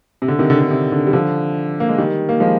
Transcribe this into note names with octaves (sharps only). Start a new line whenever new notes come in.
C3
D3
C3 D#3
D3
D3
C3
D3
G3
D3 F3
A#3
G#3
D#3 G3
A#3
F3 G#3